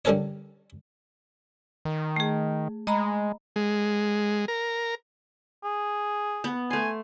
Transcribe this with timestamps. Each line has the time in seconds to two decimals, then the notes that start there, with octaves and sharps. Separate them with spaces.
0.05 D3 G3 C#4 A4 A#4 C#5
1.85 D#3
2.16 A3 G#4
2.87 G#3 D#5 A#5 B5
3.56 G#3
4.48 A#4
5.64 G#4
6.44 B3
6.71 A3 G#5 C6